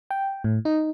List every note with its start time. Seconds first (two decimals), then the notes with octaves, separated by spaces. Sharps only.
0.11 G5
0.44 A2
0.65 D#4